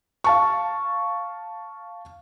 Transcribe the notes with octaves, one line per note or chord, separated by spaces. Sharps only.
F5 A5 C#6